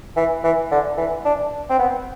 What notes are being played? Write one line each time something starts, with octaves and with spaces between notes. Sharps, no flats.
E3
E3
D3
E3
D4
C4
B3